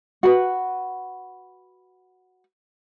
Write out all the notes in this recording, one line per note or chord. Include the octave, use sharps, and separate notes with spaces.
F#4 B4